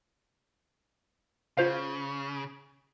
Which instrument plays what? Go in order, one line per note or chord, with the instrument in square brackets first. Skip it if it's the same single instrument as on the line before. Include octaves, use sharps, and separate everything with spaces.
[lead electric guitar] C#3 [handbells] F4 C5 F5